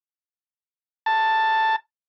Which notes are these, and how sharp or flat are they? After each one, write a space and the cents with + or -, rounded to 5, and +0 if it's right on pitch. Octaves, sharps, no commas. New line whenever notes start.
A5 +5